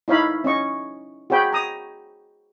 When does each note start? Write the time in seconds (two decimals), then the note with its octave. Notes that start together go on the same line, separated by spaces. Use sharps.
0.08 D#4 E4 C#5 F5 B5
0.44 C#4 D#5 C#6
1.30 F#4 G#4 C#5 G5 B5
1.53 A#5 D#6